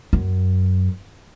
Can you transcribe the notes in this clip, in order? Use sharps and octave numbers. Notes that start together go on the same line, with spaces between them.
F#2